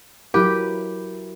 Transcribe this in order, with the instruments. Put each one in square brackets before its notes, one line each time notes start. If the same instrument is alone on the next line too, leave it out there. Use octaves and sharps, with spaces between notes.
[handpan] F#3 E4 A#4 [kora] G4 B4